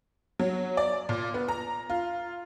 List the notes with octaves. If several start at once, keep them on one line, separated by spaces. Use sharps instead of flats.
F#3
D5
A#2
B3
A#5
F4